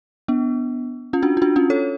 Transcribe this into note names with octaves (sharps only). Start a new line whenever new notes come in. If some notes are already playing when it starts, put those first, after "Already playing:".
B3 D4
C#4 F4
D4 F#4
F4
D4 F#4
C#4 F4
A4 C#5